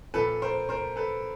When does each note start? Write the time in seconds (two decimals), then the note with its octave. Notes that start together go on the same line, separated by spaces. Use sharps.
0.14 A#2 F3 A4 B4
0.42 A#4 C5
0.69 A#4 C5
0.96 A4 B4